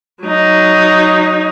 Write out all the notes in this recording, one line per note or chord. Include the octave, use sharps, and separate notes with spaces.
F#3 D#4